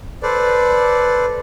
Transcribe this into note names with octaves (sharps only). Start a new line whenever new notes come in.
A4 B4 C5 D5